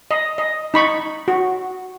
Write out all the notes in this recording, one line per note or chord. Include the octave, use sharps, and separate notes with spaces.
D#5
D#5
D#4 B5 C#6
F#4